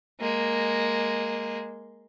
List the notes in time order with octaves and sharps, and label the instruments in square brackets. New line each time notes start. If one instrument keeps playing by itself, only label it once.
[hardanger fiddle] G#3 A#3